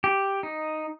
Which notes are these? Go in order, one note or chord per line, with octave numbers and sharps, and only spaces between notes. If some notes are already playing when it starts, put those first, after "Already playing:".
G4
D#4